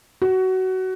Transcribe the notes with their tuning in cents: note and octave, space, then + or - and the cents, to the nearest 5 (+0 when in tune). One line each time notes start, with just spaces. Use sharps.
F#4 +20